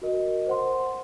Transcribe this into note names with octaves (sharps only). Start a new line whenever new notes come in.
F#4 A#4 D#5
C5 F#5 C6